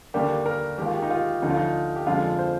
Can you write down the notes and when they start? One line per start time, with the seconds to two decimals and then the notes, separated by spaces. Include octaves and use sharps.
0.14 D#2 D3 G3 A#3 G4
0.46 A#4
0.78 D#2 D#3 G#3 G4
0.86 F4
0.94 G4
1.02 D#4
1.11 F4
1.26 G4
1.42 D2 D3 F3 D#4
1.50 F4
1.57 D#4
1.96 G4
2.06 F2 D3 F3 G#3 F4
2.39 C5